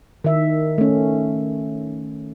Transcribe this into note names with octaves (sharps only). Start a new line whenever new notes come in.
D#3 E5
A3 C#4